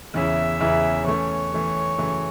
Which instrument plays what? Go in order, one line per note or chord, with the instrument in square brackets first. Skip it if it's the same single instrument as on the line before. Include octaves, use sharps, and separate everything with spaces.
[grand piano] E2 C#3 E3 C#4 E4 [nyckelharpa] E5
[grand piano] E2 C#3 E3 C#4 E4
[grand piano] E3 A3 C#4 [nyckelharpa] C#5
[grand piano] E3 A3 C#4
F#2 C#3 E3 A3